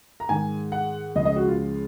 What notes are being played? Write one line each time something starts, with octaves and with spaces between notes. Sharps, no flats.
A#5
G#2 D#3 G#3 G#5
F#5
C#2 C#3 F3 G#3 D#5
D#5
F#4
F4